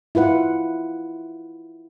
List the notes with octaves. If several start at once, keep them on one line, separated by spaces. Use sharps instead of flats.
E4 F4 B4 F#5